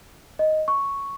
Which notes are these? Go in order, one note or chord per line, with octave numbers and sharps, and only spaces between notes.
D#5
C#6